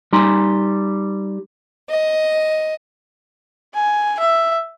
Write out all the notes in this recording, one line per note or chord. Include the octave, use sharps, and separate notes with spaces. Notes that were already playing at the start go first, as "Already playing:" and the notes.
G3 D#4 G#5 A#5 C6
D#5
G#5
E5